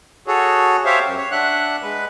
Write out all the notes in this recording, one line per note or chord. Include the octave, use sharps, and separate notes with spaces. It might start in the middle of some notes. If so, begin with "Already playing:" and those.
F#4 G#4 A4 C#5
G4 C5 C#5 E5 F5
F#2
C#5
D4 E5 F#5 F#6
G#3 B4